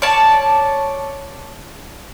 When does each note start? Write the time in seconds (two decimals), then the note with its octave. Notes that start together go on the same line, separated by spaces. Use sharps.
0.02 C#5 D5 A5